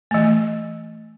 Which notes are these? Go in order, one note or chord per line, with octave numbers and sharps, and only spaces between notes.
E3 A3